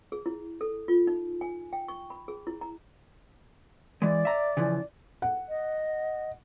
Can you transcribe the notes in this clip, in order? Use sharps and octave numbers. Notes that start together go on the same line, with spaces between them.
G#4
E4
A4
F4
D#4
G#5
G5
C#6
B5
G#4
E4
A#5
E3 G#3 D5
E5 A#5
C#3 E3 F3
F#5
D#5